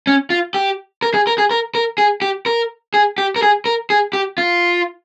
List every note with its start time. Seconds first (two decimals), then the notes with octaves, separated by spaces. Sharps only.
0.07 C#4
0.30 F4
0.54 G4
1.02 A#4
1.14 G#4
1.27 A#4
1.38 G#4
1.51 A#4
1.75 A#4
1.98 G#4
2.22 G4
2.46 A#4
2.94 G#4
3.18 G4
3.36 A#4
3.43 G#4
3.66 A#4
3.90 G#4
4.13 G4
4.38 F4